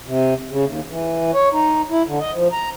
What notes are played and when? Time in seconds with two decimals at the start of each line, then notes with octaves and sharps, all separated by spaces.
0.06 C3
0.51 C#3
0.66 D#2
0.89 E3
1.34 C#5
1.53 D#4
1.90 E4
2.07 D3
2.20 D#5
2.34 F3
2.52 A#5